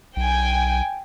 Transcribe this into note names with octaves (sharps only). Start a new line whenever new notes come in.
B1 G5 G#5